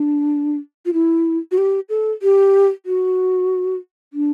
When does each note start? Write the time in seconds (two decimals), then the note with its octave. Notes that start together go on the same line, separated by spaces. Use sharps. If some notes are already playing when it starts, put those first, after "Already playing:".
Already playing: D4
0.86 F4
0.93 E4
1.52 F#4
1.58 G4
1.89 A4
2.22 G4
2.86 F#4
4.13 D4